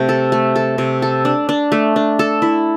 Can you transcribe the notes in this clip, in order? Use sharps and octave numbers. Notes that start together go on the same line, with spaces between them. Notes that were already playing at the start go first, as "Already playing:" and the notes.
Already playing: C3 A3
A4
A3
A4
C3
A4
D4
D4
A3
D4
A4
E4